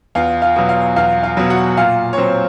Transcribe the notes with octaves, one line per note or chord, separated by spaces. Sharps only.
E2 F4 F5
F4 F5
B2 F#3
F4 F5
E2 F4 F5
F4 F5
B2 F#3
F#4 F#5
A#2 F4 F5
C#5
F#3 C4 C5